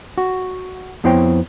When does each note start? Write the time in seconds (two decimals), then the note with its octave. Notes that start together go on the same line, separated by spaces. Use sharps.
0.18 F#4
1.04 F2 B3 E4 C5 C#5 G5